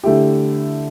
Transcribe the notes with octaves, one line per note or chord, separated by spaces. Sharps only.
D3 A3 E4 G4